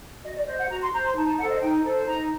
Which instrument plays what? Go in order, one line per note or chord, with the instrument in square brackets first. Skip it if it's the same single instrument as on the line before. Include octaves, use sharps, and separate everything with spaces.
[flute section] F#4 D#5
D5
C5 D#5
F#5
F#4 A#5
C6
C5 A#5
C6
D#4 A5
A5
C5 F#5
A4
D#5
D#4 G5
A4 C5
D#4 A#5